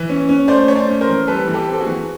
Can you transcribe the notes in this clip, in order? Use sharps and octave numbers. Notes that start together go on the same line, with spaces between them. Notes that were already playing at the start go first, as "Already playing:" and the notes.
Already playing: E3
C#4
C#4
A3 C5 D5
A3 C#5
C5 D5
C#4
A#4 C5
E3
G3 A4 B4
E3
G4 A4
C4
A4
F#4 G#4
E3